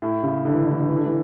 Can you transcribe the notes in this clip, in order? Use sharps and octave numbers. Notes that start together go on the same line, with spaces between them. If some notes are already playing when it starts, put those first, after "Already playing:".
A2
C#3
D3
E3
D3
E3
D3
E3
D3
E3